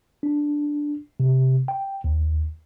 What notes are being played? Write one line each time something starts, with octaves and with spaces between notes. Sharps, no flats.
D4
C3
G5
D#2